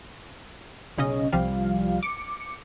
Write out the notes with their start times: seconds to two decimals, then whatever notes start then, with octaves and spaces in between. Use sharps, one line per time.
0.98 B1 C#3 C#4 D#5
1.33 C2 F3 G3 F5
2.03 D6 C#7